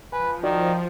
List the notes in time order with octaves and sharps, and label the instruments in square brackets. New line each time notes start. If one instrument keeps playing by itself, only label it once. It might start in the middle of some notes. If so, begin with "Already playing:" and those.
[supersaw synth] F3 [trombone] B4 [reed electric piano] G#5
[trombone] D#3 [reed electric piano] D#4 F#4 D5